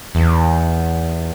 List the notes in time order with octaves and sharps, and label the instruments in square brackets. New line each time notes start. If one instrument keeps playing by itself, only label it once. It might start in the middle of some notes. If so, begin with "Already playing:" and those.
[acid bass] E2